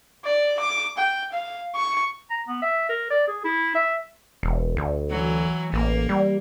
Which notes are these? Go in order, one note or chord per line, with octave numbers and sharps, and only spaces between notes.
D5
D6
G5
F5
C#6
A#5
B3
E5
A#4
D5
G#4
E4
E5
E1
D2
E3 F#3
A1 A#3
G3